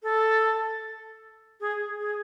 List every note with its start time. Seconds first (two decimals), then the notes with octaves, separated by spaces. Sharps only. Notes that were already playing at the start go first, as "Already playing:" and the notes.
0.03 A4
1.61 G#4
1.99 G#4